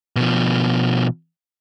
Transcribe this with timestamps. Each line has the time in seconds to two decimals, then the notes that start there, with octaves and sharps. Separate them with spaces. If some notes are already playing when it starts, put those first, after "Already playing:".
0.16 B2 F3